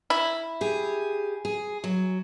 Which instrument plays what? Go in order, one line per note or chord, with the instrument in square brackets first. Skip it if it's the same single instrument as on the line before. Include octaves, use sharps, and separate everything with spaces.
[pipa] E4
[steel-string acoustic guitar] G4 G#4
G#4
F#3